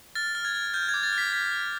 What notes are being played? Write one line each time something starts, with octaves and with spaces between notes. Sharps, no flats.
F6 A6
F6
G#6
F6
F6 G6
G#6
D6
A6
F6
B6
F6 B6
F6